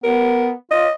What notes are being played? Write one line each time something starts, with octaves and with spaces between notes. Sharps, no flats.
B3 A#4
F4 D#5